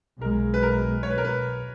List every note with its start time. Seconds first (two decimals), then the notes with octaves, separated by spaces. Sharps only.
0.22 B1 B2 G#3 A#4
0.54 B4
0.63 A#4
1.03 C#5
1.10 B4
1.18 A#4
1.25 B4